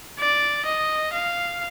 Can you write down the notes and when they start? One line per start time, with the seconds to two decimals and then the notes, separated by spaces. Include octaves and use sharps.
0.19 D5
0.66 D#5
1.13 F5